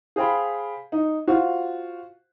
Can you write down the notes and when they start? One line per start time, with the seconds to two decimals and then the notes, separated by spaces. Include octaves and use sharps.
0.16 G#4 C5 F5 G5 B5
0.92 D#4
1.28 F4 F#4 C5 F5